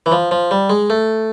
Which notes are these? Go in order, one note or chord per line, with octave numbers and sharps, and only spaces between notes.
E3
F3
F3
G3
G#3
A3